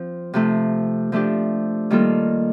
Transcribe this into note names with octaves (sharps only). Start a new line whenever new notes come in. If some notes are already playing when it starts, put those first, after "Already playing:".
Already playing: F3 C4
C3 F3 A3
F3 A3 D4 G4
D#3 G3 A#3 F4 A4